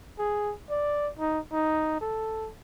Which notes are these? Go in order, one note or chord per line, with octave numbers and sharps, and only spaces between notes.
G#4
D5
D#4
D#4
A4